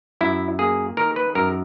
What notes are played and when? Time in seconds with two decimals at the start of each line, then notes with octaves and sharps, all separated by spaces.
0.21 F#2 E4
0.59 A#3 G#4
0.97 D#3 A#4
1.16 B4
1.35 F#2 A#4